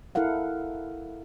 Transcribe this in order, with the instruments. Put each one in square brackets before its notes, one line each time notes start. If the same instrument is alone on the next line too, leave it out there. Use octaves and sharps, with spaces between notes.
[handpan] E4 A4 A#4 F5 F#5